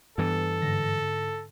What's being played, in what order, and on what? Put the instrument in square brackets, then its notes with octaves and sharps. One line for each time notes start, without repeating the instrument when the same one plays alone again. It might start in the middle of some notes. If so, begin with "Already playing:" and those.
[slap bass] G2 E3 [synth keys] B3 [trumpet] A4
[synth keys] G#2 D3 A#6